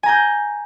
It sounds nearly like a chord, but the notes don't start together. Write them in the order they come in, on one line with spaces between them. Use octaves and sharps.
G#5 A#5 G6